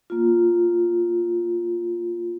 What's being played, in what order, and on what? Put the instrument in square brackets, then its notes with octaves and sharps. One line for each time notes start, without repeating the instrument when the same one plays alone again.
[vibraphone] A#3 F4